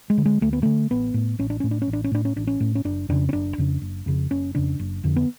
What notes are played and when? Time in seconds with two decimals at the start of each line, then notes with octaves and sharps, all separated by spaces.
0.10 G#3
0.18 D3
0.25 G#3
0.41 D2 A3
0.53 B3
0.63 D3 A3
0.90 A1 B3
1.14 A2
1.39 A1 C#4
1.50 D4
1.60 A2 C#4
1.71 D4
1.82 C#4
1.88 A1
1.93 D4
2.04 C#4
2.11 A2 D4
2.25 C#4
2.36 A1 D4
2.47 C#4
2.60 A2
2.75 C#4
2.85 F#1 D4
3.09 F2 C#3 D4
3.29 C#4
3.33 F#1 D4
3.58 F2 C#3
3.82 F#1
4.06 F2 C#3
4.31 F#1 C#4
4.55 F2 C#3 D4
4.79 F#1
5.04 F2 D3
5.16 B3